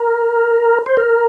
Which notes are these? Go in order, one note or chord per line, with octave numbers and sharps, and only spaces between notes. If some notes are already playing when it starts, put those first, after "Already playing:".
Already playing: A#4
C5
A#4